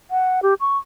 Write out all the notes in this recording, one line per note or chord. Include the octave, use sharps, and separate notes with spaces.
F#5
G4
C#6